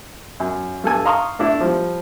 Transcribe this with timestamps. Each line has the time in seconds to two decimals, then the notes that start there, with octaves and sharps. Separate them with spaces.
0.40 F#2
0.84 G2 A4 G#5
1.05 F5 A#5 C6 C#6 D#6
1.39 A3 D4 E4
1.61 F3 G3